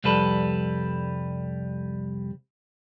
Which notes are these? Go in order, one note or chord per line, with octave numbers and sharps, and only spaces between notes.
C2 F2 G3 A4 B4